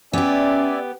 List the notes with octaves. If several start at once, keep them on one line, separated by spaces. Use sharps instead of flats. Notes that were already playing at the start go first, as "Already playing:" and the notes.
B3 C#4 G4 D5 E5 G#5